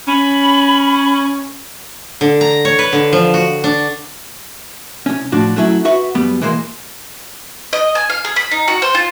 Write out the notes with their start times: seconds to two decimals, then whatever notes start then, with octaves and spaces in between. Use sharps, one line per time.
0.08 C#4 B5
2.21 D3
2.41 A#5
2.65 C#5
2.79 B4
2.93 D3
3.13 F3
3.34 F#4
3.64 D4
5.06 C2 C#4
5.32 A2 F3 D4 F#4
5.56 F#3 A3 C#4 E4
5.85 F#4 B4 E5 F#5
6.15 F#2 G3 B3
6.41 E3 G#3 A#3 C5
7.73 D#5
7.95 G#5
8.10 F5
8.25 G#4
8.36 B5
8.51 D#4
8.68 F#4
8.82 C5
8.95 F4